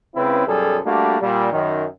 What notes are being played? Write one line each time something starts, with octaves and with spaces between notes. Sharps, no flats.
C#2 C#3 C4 E4 B4
B1 F#2 G3 G#4 A4
G3 A3 A#3 D4 F#4
A#2 G3
F#2 D#3